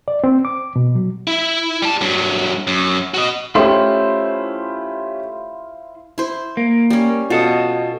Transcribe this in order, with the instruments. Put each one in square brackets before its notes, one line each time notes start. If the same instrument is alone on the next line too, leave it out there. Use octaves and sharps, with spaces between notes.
[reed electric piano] D5
C4
D6
B2
F#3
[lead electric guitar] E4
G3 A5
G2 F#3
F#2
F#4 D#5
[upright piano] A3 C#4 G4 [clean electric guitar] E4 F4 C5
[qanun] E4 C5
[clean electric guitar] A#3
[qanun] G3 C#4
[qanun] B2 [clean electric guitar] F4 A4 D#5